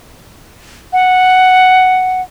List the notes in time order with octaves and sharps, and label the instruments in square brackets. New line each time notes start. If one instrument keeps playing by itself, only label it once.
[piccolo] F#5